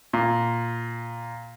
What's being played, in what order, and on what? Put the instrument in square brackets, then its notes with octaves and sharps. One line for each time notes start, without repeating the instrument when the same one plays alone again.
[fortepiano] A#2